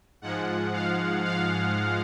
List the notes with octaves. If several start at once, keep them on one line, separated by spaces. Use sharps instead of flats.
G#2 F3 G#3 F#5
F5
F5